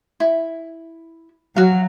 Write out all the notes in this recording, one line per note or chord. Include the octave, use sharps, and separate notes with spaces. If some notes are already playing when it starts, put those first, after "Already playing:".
E4
F#3 F#4 F5